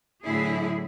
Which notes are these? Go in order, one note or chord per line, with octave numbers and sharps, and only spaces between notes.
A2 D3 F#3 E4 G#4